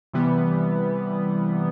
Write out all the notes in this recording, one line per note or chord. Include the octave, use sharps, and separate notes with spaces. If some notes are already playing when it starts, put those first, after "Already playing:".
C3 E3 G3 B3